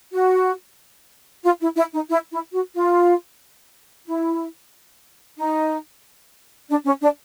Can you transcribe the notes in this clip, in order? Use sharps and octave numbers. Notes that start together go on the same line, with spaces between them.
F#4
F4
E4
E4
D#4
E4
E4
F#4
F4
E4
D#4
D4
C#4
D4